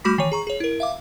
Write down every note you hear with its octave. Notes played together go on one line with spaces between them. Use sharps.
G3 A3 F#4 B5 D6 B6
D#3 E3 C#5 D#7
G#4 A#5 C#6
G#4 C#5
E4 A#4
E5 F5 D6